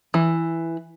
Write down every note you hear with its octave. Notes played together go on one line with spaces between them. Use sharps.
E3